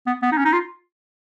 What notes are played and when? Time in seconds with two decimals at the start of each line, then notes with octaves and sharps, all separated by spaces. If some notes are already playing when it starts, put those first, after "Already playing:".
0.07 B3
0.22 B3
0.32 D#4
0.37 C#4
0.45 D#4
0.53 F4